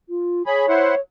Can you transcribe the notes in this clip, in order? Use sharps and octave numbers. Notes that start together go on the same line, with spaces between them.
F4
G#4 C#5 B5
E4 C5 F#5